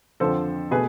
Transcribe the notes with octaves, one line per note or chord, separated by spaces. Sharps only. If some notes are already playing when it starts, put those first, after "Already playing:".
F2 D3 F3 A4 C5
B2 A3 G#4 B4